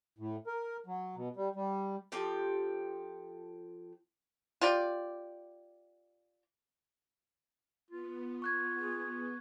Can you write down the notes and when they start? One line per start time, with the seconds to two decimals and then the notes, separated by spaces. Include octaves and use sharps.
0.18 A2
0.47 A#4
0.86 F#3
1.16 B2
1.36 G3
1.55 G3
2.12 F3 C4 G4 A4
4.61 F4 G4 D5
7.91 B3 F4
8.42 C#6 F#6 G#6
8.78 G#4